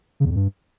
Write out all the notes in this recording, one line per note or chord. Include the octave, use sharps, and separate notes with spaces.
C#3
E2
F2
G2